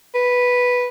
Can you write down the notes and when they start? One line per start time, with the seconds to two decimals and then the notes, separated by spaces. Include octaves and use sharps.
0.15 B4